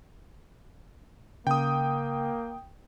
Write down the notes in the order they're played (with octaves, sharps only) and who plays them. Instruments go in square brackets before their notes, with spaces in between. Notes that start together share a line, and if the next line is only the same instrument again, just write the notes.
[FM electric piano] C#3 [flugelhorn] A#3 [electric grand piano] G5 D#6